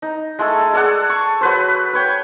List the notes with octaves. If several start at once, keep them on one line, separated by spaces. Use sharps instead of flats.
D#4
G#3 A3 G#4 A4
G#4 A4 D5 F#5
C#6
F#3 B4 C5
B4 C#5 G5